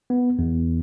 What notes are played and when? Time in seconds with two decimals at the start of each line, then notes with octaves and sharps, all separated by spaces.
0.10 B3
0.39 E2